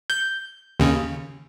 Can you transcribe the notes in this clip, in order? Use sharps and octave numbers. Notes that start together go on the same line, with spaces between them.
G6
D#2 C#3